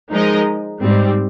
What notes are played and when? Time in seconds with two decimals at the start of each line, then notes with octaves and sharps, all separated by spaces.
0.11 F3 G#3 D#4 A#4 D#5
0.81 G#2 G3 C4